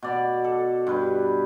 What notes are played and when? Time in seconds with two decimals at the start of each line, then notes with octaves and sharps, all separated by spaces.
0.02 B2 D5
0.44 A4
0.87 G2 B4